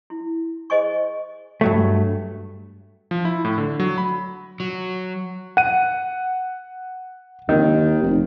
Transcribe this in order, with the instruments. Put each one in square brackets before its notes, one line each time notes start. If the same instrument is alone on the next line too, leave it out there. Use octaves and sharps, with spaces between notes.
[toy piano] E4
G#4 C5 D#5 G#5 C#6
[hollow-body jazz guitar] G2 F#3 A3
[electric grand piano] F3
E4
A2
D3
F#3
B5
[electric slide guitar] F#3
[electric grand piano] F#5 D#7
[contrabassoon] D#2 [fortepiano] D#3
[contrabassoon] F1